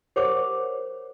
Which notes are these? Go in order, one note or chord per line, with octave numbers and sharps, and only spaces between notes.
G4 A#4 C5 C#5 F#5 D6